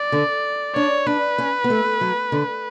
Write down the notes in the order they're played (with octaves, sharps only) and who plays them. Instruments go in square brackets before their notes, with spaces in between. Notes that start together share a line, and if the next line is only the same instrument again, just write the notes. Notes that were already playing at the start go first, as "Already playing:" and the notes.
Already playing: [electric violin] D5
[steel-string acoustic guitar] D3
[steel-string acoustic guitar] D4 [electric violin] C#5
[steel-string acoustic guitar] D4 [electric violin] B4
[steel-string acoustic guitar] C#4
B3
A3
F#3
D3